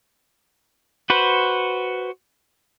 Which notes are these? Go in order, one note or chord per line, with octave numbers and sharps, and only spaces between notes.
F#4 B4 C5